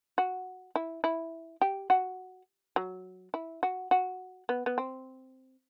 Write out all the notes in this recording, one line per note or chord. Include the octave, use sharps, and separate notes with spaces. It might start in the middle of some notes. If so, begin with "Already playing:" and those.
F#4
E4
E4
G4
F#4
F#3
E4
F#4
F#4
B3
B3
C4